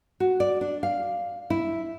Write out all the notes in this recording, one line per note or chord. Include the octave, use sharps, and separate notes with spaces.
F#4
D5
D4
F5
E4